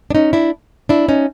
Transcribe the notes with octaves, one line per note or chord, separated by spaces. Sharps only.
D4
C#4 D#4
D4 E4
D4 E4
C#4 D#4